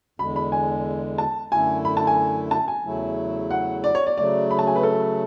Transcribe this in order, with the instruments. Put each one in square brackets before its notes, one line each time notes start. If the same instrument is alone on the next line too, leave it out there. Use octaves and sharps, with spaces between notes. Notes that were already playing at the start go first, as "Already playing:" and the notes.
[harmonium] E2 D3 G#3 [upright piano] B5
[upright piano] B5
G#5
A5
[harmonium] F#2 D3 A3 E4 [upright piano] G#5
[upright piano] B5
A5
G#5
A5
G#5
[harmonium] E2 C#3 F#3 A3 E4
[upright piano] F#5
D5
C#5
D5
[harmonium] C#3 F#3 A3 [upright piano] D5
[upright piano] B5
A5
G#5
B4
A4